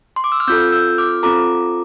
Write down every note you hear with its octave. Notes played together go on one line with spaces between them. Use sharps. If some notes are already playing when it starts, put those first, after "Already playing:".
C6
D6
E6
F6
C4 F4 A4 E6 G6
E6 G6
D6 F6
C4 F4 A4 A#5 D6